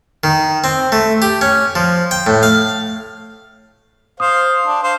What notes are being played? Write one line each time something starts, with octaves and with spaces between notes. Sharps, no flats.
D#3
C4
A3
G4
C#4
F3
G5
A2
F5
C5 F5 D#6
D4
C5 F5